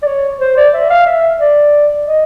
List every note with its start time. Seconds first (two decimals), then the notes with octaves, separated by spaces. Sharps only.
0.03 D5
0.07 C#5
0.40 C5
0.57 D5
0.74 E5
0.90 F5
1.07 E5
1.40 D5
2.07 D#5